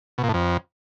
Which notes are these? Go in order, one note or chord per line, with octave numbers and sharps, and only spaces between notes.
B2
A#2
A2
F2